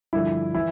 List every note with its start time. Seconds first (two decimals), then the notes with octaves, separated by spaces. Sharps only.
0.13 G2 D3 F3 E4
0.55 E3 E4